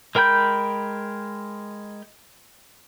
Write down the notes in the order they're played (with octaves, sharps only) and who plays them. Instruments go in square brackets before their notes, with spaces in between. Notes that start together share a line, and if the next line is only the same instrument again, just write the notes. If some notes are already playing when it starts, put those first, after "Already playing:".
[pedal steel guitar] G#3 A#4 G5 B5 G6